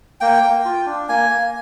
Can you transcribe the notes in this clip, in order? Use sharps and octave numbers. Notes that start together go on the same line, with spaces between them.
A#3 G5
A#3
F4
D4
A#3 G#5
A#3